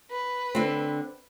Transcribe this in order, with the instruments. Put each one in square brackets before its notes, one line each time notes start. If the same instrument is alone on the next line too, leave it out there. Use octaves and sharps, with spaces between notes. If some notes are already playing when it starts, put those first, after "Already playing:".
[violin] B4
[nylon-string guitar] D3 C4